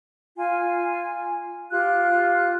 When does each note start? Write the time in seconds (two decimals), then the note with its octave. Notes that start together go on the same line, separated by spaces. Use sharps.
0.37 F4 G#5
1.71 F4 G4 F#6